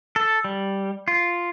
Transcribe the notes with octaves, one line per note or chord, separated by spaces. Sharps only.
A4
G3
F4